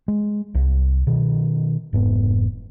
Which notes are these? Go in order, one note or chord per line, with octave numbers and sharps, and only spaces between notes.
G#3
C2
B2 D#3
F1 G#2 B3